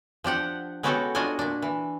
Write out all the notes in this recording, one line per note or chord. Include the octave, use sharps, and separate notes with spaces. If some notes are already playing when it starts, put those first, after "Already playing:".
F3 D4 G4 F#5
G#3 B3 C#4 F#4 G4 A4
D4 F4 F#4 D#5 G#5
A#2 D4
E3